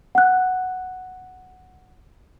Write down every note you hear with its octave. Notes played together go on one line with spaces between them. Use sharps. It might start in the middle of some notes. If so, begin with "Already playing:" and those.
F#5 F#6